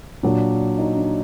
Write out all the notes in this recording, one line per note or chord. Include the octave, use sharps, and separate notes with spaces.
A#2 F#3 D4
D#4
D4